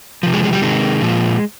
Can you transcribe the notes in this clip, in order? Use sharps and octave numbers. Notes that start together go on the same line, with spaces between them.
C3 F3
G#3
G#3
G3
C3 D#3 G#3
A#2 F3